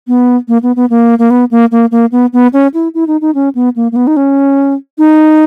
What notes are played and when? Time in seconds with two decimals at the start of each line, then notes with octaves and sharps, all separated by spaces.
0.08 B3
0.48 A#3
0.63 B3
0.76 B3
0.90 A#3
1.19 A#3
1.30 B3
1.51 A#3
1.72 A#3
1.91 A#3
2.12 B3
2.33 B3
2.53 C#4
2.74 E4
2.94 E4
3.07 D#4
3.21 D#4
3.35 C#4
3.55 B3
3.76 A#3
3.92 A#3
3.96 B3
4.07 D#4
4.17 C#4
4.98 D#4